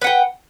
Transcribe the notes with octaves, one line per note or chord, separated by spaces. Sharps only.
B4 F#5 G5